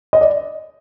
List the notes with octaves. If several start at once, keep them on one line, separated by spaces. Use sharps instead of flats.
D#5
D5